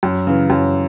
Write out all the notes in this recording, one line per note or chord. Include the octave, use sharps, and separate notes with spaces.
F#2
C#3 E3
F#2